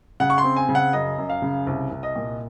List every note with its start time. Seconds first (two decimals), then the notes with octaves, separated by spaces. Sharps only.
0.20 C#3 F#5
0.30 C#6
0.38 C6
0.44 C4
0.56 G#5
0.69 C#3
0.75 F#5
0.93 F#2 D#5
1.18 F#2
1.29 F5
1.42 C#3
1.67 C2
1.91 C2
2.03 D#5
2.15 A#2